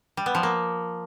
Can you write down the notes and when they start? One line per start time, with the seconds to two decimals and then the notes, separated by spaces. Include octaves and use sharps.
0.17 G3
0.26 B3
0.35 F3
0.43 A#3